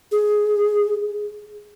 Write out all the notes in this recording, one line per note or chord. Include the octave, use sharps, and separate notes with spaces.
G#4